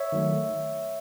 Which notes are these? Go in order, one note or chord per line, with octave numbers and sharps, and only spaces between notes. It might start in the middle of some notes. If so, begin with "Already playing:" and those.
Already playing: C#5 E5
D#3 F#3 A3